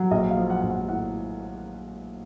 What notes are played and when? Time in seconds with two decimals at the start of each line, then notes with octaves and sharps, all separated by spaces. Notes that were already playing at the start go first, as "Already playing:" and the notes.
Already playing: F#3
0.11 A#1 D#5
0.31 F5
0.37 F3
0.50 F#5
0.63 A#1
0.69 F#5
0.89 A2 F#5